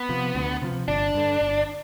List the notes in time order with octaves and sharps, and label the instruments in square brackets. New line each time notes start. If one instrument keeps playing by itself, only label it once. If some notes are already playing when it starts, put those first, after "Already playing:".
Already playing: [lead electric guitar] B3
[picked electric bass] C3 F3
D2
C3 F3
[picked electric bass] G1 [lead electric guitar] D4
[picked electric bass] G2 D3
G1